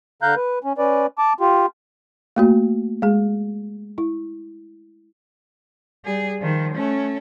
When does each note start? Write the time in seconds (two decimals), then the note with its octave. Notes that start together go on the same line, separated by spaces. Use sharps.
0.22 D3 F5 A#5 F#6 G6
0.36 B4
0.64 C#4
0.78 C#4 B4 D5
1.18 A5 D6
1.40 F4 G4
2.36 A3 A#3 F#4
3.02 G#3 G#4
3.98 E4
6.05 G3 G#4
6.39 D#3 F3
6.73 A3 C#4